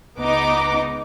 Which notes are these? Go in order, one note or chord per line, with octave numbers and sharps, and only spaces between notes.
C#2 B3 D#4 D6